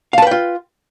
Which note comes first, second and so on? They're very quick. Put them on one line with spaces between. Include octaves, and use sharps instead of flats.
F5 A5 B4 G5 F4